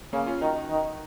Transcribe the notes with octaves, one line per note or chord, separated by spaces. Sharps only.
C#3 A#3 C#4
C#4 F4
D#3 D#4 F#4
D#3